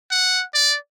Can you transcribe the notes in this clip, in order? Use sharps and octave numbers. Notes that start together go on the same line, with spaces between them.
F#5
D5